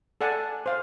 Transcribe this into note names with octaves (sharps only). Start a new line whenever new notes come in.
A4 D5 F#5 G#5 A5
C5 F5